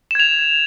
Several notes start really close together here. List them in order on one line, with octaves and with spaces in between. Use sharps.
E7 G#6 F7